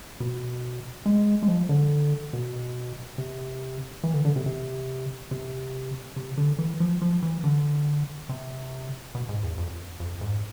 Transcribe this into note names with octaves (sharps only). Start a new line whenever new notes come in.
B2
G#3
G#3
F3
D3
B2
C3
E3
D3
D3
C3
C3
C3
C3
D3
E3
F3
F3
E3
D3
C3
B2
G#2
E2
F2
F2
G#2